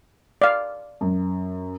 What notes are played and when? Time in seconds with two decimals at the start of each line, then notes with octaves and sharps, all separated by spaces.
0.42 D5 F5
1.01 F#2